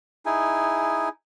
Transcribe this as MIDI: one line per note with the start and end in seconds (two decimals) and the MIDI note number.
0.26 1.09 63
0.26 1.09 64
0.26 1.09 68
0.26 1.09 80